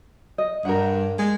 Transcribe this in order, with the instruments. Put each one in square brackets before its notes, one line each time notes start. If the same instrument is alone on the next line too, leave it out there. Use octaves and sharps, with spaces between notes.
[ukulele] D#5
[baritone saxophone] G2 [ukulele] A#4 F#5
[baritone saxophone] G#3